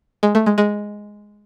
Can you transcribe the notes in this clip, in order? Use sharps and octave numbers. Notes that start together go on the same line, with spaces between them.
G#3
A3
G#3
G#3